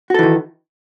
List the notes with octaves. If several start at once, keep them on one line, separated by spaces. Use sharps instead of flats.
D#3 E3 F#4 A4